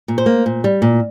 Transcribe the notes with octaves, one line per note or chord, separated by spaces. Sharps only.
A#2
C5
A#3
A#2
G3
A#2